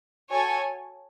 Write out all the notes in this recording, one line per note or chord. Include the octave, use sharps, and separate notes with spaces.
F#4 A4 C#5 G#5